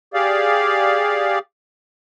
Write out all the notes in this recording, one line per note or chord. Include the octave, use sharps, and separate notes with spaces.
G4 G#4 D5 F5